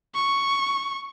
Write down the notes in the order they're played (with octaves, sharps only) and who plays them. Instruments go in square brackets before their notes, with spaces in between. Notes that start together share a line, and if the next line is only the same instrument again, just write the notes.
[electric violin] C#6